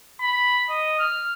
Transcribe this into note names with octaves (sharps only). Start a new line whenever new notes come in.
B5
D#5
F6